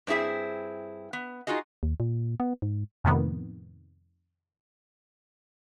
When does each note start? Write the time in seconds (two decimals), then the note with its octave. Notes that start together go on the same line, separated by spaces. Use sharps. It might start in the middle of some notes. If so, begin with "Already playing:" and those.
0.07 G2 C4 E4 G#4 E5
1.13 B3
1.47 D#4 F4 F#4 G#4 D#5
1.83 D#2
2.00 A#2
2.40 B3
2.62 G#2
3.04 F2 A2 C3 D#3 A#3 B3